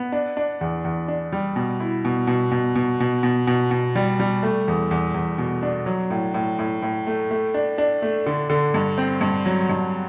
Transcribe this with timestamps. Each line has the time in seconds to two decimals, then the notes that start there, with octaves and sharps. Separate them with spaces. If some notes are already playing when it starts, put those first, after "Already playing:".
Already playing: B3
0.12 D4
0.37 D4
0.61 E2
0.85 E2
1.08 D4
1.33 G3
1.56 B2
1.80 E4
2.05 B2
2.27 B2
2.52 B2
2.75 B2
3.00 B2
3.23 B2
3.47 B2
3.71 B2
3.96 G3
4.20 G3
4.43 A3
4.68 E2
4.91 E2
5.14 E2
5.38 B2
5.63 D4
5.86 F#3
6.10 A2
6.34 A2
6.59 A2
6.82 A2
7.07 A3
7.31 A3
7.54 D4
7.78 D4
8.02 A3
8.26 D3
8.50 D3
8.74 G2
8.98 C4
9.21 G2
9.45 F#3
9.69 G2